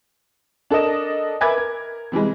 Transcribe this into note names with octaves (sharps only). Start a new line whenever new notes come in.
D4 A4 A#4 D#5 E7
A#4 B4 E5 G#5 D6 G#6
A#4
C3 E3 G3 G#3